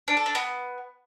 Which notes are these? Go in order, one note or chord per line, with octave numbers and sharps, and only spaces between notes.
D4
A4
D4
B3